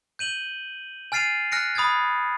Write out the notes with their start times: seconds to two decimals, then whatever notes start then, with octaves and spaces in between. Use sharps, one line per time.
0.19 G6 D#7 F#7 G7
1.12 G#5 F6 A6 C7 D#7 F7
1.52 G#5 F6 F#6 A#6 C#7 D7
1.75 B5 D#6 F6 G#6 A6